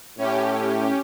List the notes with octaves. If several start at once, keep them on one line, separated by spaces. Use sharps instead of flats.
A2 C#4 G4